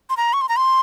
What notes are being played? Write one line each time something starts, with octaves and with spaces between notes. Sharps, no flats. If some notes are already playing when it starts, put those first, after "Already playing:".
C6
A#5
C#6
C6
A#5
C6